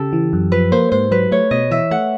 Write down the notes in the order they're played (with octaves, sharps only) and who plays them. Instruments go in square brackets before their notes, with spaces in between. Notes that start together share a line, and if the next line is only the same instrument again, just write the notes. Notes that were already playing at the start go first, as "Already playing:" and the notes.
Already playing: [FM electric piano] C#3 [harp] G4 A4
[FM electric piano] E3
F#2
[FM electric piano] F3 [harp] B4
[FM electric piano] A#3 [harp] C5
[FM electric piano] G#2 [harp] C5
[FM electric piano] F#3 [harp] B4
[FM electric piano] A3 [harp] C#5
[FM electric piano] B2 [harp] D#5
[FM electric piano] E3 [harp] E5
[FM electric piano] A3 [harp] F#5